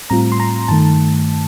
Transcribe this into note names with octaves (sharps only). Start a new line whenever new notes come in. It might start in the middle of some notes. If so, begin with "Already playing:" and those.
A2 G3 C4 F4 A#5
C6
A#5
G2 D#3 A3 A5